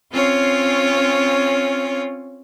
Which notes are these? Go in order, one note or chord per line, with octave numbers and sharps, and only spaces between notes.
C4 C#4 F4 C#5